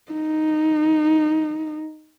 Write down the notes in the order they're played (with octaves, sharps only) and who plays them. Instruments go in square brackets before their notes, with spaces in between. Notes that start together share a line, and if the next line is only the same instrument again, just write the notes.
[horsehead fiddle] D#4